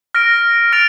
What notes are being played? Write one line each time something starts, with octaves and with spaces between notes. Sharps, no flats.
F6 A#6 D7
F6 A6 D7 F7